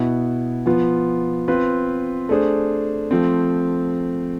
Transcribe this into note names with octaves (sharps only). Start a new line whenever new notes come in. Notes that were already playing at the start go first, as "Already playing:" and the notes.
Already playing: B2 B3 E4
F3 B3 F4
C4 F4 B4
A3 D4 G#4 C5
F3 A3 C4